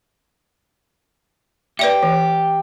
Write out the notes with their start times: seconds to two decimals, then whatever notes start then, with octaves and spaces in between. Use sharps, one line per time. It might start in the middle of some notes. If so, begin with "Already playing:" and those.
1.79 G4 B4 D5 E5
2.03 E3